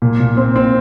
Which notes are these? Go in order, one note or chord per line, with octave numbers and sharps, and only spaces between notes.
A#2
A#2
C4
C4